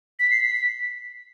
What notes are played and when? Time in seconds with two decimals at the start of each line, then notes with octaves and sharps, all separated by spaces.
0.19 B6
0.31 C7
0.40 B6